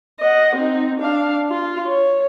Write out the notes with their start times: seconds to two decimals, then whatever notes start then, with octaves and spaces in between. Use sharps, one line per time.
0.20 D#5 F#5
0.56 C4 D#4
1.00 D4 F5
1.49 F4
1.86 C#5